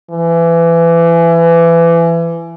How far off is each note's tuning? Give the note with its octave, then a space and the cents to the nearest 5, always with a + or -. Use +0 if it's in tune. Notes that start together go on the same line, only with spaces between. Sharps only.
E3 +25